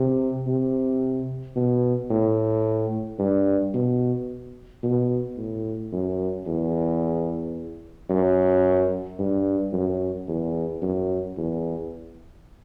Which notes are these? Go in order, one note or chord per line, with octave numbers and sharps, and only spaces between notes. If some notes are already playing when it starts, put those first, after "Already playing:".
Already playing: C3
C3
B2
A2
G2
B2
B2
A2
F#2
E2
F#2
G2
F#2
E2
F#2
E2